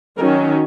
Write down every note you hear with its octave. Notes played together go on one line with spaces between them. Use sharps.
D#3 F#3 C#4 A#4